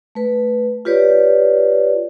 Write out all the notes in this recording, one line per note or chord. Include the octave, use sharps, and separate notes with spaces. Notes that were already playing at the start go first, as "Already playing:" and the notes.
A3 B4
F4 G4 B4 C#5 D5